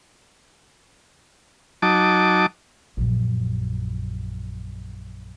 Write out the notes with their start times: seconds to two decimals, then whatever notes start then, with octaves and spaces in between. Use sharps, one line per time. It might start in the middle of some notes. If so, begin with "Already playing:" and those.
1.82 F#3 D#4 A5 D6
2.97 A#1 F#2